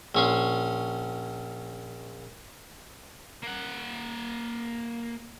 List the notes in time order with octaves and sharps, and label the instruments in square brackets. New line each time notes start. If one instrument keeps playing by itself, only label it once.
[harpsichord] A#1 C#4 C5
[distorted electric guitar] A#3 F#5